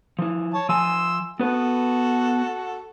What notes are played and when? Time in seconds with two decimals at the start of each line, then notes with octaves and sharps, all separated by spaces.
0.19 F3 E4
0.54 C#5 A5
0.69 F3 G#5 C6 E6
1.40 B3 F#4 A4 B4